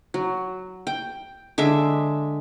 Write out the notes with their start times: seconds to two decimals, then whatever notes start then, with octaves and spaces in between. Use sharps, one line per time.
0.14 F#3
0.87 G5
1.58 D3 G#3 E5 D6